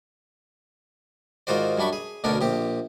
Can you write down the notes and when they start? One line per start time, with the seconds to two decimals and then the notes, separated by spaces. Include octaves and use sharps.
1.47 G#2 D#3 F4 F#4 C5 D5
1.78 F#2 G3 D4 B5 C#6
1.93 G#4
2.24 D2 B2 C#4 D4 A#4 D5
2.41 A#1 C4 G4